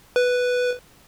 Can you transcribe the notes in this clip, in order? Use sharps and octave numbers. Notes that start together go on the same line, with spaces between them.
B4